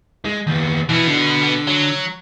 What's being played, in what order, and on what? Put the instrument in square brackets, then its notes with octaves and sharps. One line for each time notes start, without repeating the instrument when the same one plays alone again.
[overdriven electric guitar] G#3
D#2 B3
[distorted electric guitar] B2 B3 [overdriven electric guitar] E3
[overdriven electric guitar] D3
[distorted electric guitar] F#3